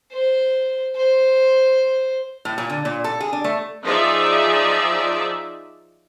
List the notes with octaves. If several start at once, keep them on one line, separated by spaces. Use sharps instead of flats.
C5
C5
A2
A#2
D3
A#2
A4
G#4
D4
A3
F3 D#4 F4 G#4 D5 E5